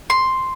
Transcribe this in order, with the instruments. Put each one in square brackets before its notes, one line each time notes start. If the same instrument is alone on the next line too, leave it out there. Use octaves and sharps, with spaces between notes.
[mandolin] C6